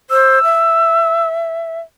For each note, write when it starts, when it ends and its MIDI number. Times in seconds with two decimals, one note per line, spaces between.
0.10 0.42 72
0.10 1.26 88
0.44 1.79 76